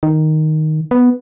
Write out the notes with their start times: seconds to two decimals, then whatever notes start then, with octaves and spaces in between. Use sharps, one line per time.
0.03 D#3
0.91 B3